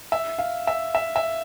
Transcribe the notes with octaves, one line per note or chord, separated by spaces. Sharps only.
E5
F5
E5
E5
E5